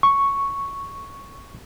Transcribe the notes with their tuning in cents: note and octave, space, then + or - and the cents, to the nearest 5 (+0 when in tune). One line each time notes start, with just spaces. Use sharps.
C#6 +0